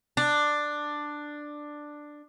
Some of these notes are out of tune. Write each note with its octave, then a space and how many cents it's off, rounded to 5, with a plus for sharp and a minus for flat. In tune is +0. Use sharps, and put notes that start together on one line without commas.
D4 +10